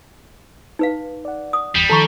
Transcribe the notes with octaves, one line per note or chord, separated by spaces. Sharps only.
D#4 B4 F5
D5 F#5
D#6
G1 E2 G3
D#3 F3 A4 A5 A#5 C#6